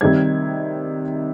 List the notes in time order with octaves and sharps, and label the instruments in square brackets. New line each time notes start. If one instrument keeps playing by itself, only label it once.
[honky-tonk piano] C3 D#3 G3 G#6